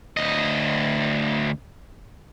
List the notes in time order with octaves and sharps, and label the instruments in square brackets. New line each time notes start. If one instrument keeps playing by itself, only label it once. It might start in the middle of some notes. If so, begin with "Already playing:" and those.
[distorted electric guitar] D2 D#5